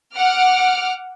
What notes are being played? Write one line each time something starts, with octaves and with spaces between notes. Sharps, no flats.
F#5 D6 F6